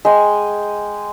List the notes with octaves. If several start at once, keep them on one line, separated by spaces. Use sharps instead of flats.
G#3 G5 G#5